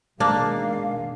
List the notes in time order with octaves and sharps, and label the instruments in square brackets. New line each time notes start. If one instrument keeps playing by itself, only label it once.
[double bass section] B2 D#3 G#3 [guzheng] A#3 [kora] D4 [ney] F5